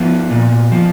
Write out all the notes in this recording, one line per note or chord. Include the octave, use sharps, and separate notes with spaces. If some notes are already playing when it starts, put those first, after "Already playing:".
Already playing: F3 B3
A#2
F3